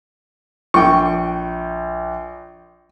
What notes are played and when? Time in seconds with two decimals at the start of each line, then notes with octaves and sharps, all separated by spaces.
0.74 A#1 G5 C#6